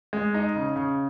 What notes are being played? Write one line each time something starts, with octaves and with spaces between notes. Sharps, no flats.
G#3
D#4
C#3
C#3